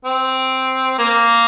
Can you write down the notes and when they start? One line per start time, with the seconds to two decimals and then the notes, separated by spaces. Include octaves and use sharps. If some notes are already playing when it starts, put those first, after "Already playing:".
0.05 C4
0.99 A#3